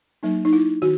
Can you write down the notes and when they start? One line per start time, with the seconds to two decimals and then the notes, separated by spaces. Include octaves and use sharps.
0.23 F#3 A#3 D#4
0.45 D#4
0.53 E4
0.82 D#3 F#4